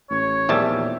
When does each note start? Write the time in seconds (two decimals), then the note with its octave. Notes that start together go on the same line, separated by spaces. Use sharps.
0.10 A1 C#5
0.49 A#1 E2 A#2 D#3 G3 E5 A5